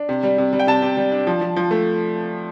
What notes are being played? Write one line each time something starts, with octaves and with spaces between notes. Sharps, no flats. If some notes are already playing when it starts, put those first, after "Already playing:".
Already playing: D4
C3
G3
C3
G3
G5
C3 A5
C3
G3
D4
F3
F3
F3
A3